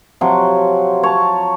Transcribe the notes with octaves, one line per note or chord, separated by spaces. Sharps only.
C3 F3 F#3
C#5 A5